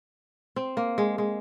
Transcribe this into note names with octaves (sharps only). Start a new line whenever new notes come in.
C4
A#3
G#3
G#3